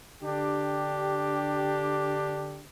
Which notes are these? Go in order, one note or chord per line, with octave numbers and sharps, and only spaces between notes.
D3 D4 G4